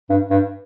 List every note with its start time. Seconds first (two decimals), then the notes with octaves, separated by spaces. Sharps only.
0.10 G2
0.30 G2